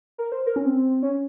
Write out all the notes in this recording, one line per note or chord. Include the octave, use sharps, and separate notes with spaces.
A#4
C5
A#4
C#4
C4
C#4